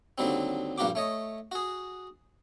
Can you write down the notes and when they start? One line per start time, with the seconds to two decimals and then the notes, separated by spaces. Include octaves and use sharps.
0.18 D#2 D3 F#3 G3 C4
0.78 A#1 G2 A#3 F#4 G4 D6
0.95 A3 C#5 D#5
1.52 F#4 G#4